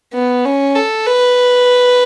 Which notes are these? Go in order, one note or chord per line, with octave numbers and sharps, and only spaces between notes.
B3
C#4
A4
B4